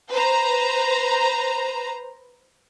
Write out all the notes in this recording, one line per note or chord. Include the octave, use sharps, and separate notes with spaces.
B4 C5 A#5